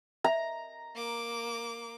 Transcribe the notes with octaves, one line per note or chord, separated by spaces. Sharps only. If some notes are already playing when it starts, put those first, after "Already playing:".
E5 A#5
A#3 D6